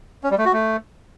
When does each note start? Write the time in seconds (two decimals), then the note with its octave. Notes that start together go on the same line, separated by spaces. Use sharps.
0.23 C#4
0.31 G3
0.38 A3
0.45 F#4
0.53 A3